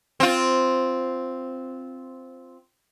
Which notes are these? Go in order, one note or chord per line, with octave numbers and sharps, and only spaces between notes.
C4 F4